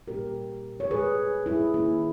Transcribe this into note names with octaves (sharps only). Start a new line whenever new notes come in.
A#2 G3 A#3 C#4 G4 A#4
C#5
G#4 B4
E4 G#4
D#3 A#3 C#4 E4